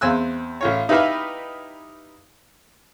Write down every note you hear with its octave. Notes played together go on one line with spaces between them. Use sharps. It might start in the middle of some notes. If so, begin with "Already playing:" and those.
E2 C4 G#5 E6 F#6
A1 F4 C#5
D#4 E4 G4 B4 E5 F5